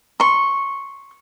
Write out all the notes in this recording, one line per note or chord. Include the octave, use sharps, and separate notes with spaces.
C6 C#6